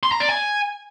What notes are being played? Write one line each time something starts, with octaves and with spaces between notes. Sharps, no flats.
C6
A#5
D5
G#5